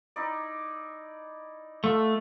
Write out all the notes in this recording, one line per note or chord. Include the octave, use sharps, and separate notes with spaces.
D#4 E4 D5
A3 F4 A4 F5